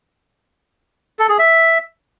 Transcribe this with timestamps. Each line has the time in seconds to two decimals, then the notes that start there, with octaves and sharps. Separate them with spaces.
1.19 A4
1.29 G#4
1.39 E5